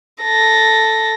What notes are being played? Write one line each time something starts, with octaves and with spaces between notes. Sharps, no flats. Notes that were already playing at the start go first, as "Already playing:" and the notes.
A4 A#6